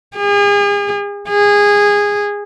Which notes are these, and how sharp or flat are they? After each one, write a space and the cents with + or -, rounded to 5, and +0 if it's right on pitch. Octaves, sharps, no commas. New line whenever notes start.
G#4 -40
G#4 -20